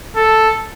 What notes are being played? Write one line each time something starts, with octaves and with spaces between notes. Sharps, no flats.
A4